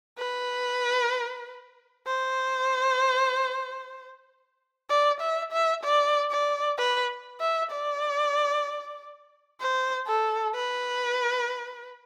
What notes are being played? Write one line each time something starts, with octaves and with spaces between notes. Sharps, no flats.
B4
C5
D5
E5
E5
D5
D5
B4
E5
D5
C5
A4
B4